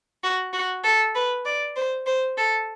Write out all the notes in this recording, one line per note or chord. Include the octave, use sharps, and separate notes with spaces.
F#4
F#4
A4
B4
D5
C5
C5
A4